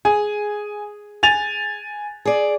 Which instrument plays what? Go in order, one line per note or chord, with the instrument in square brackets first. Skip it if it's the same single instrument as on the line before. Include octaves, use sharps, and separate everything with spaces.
[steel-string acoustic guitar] G#4 [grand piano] G#5
[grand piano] G#5 A6 F7
[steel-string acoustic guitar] G#4 D5